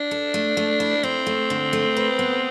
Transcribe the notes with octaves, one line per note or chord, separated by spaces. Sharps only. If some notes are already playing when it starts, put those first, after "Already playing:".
Already playing: D4
A4
A3
A3
E4
C4 E4
A3
D3
A3
B4
B3